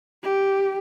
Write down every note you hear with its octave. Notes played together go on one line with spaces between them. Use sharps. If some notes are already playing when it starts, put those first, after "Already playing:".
G4